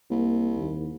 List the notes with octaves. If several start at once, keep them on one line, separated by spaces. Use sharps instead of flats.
C2 A#3
D#2